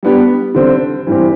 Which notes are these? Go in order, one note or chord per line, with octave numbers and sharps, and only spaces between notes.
G3 B3 D4 G4
D3 G3 C4
G2 E3 G3 C4 G4